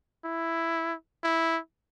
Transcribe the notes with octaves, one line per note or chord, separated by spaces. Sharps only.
E4
E4